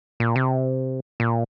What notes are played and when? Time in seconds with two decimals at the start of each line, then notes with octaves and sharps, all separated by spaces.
0.20 A#2
0.36 C3
1.20 A#2